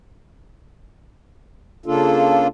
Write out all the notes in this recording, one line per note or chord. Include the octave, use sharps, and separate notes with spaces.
C#3 A#3 D4 F4 A4